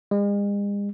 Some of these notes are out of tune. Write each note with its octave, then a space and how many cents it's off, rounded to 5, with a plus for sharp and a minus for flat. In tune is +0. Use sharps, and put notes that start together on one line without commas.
G#3 -45